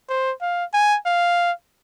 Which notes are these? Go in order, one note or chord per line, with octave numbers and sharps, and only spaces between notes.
C5
F5
G#5
F5